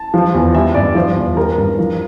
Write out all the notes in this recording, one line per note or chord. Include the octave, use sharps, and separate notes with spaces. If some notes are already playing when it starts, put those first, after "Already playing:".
Already playing: A5
F3
E2
G3 E5
G2 D5
F3 C5
E2
G3 A#4
G2
F3